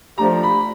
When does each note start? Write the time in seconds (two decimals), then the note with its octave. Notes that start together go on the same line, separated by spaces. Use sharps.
0.18 F3 A3 D4 G4 A#5
0.43 B5